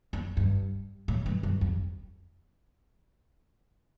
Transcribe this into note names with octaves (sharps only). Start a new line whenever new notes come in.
F2
G2
A2
G2
G2
F2